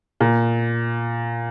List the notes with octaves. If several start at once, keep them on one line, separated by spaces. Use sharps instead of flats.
A#2